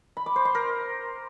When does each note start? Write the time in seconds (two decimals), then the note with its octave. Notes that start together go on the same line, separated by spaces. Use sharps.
0.17 B5
0.26 D6
0.36 C5
0.45 C6
0.55 A#4